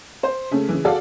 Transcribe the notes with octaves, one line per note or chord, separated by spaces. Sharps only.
C5
C#3 A3 C#4
C#3 E3
F#4 G#4 A4 D5 F5